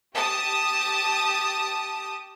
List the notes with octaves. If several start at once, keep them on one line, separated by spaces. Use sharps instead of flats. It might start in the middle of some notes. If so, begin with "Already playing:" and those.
G4 A5 D#6